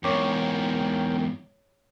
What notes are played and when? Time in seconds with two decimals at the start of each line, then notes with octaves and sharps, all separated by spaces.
0.04 E2 G#2 C#4 A#4 C#5 G5 C#6 D6